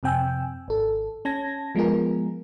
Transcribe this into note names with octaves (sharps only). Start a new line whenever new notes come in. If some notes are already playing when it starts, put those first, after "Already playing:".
F2 C3 C4 G5 G#5 E6
G#1 A4
C#4 A5 G#6 A#6
F3 G#3 B3 F4 G#4 A#4